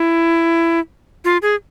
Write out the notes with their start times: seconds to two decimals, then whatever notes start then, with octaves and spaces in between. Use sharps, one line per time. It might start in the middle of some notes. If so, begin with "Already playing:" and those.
Already playing: E4
1.25 F4
1.42 G#4